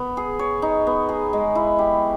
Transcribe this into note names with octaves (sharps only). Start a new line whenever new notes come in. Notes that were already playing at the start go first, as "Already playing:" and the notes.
Already playing: B3
G#4
C#5
D#4
B3
G#4
G#3
E4
G4